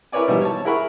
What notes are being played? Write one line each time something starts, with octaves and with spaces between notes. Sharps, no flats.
E4 A#4 B4 C#5 D5 G#5
G#2 B2 E3 F3 G3
C#5 A5
E4 G#4 A#4 F#5 B5 C#6